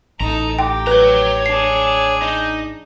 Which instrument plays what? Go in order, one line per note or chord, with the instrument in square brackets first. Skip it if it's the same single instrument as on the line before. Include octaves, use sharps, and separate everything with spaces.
[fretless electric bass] A1 [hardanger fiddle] D#4 A4 [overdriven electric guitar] A#5
[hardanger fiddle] G4 [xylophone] G5
[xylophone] B4 [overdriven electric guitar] C#5 A#5
[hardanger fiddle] D4 G#4 [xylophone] C7
[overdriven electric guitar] D#4